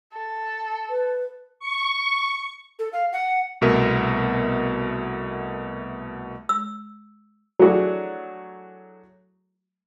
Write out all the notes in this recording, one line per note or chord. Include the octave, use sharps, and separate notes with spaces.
A4
B4
C#6
A4
F5
F#5
C2 B2 A3 B3 A#4 E5
E6
F#3 A3 D4 E4 F#4 G#4